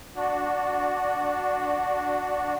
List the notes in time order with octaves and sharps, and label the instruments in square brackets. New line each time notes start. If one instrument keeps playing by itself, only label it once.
[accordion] D4 F#4